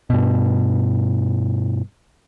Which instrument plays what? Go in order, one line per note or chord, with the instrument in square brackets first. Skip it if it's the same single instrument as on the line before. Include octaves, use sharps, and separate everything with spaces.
[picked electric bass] G2 B2